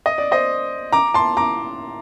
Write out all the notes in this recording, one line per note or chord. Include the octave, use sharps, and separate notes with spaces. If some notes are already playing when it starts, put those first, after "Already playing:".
D#5
D5
C5 D#5
A#5 D6
A5 C6
A#5 D6